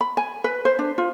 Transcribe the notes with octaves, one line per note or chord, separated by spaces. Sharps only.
B5
G#5
B4
C5
D4
F4